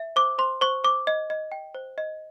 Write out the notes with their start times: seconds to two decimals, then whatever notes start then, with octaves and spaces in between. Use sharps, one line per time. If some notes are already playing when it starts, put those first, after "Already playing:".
Already playing: E5
0.16 C5 D6
0.38 C5 C6
0.61 C5 C#6
0.84 C5 D6
1.07 D#5
1.30 D#5
1.52 G5
1.75 C5
1.98 D#5